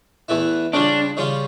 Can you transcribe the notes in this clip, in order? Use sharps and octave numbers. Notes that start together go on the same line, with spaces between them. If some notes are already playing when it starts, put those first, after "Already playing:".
E2 E3 A3 E4
C#3 G3 C#4 D4 F4
C#3 G3 C#4 F4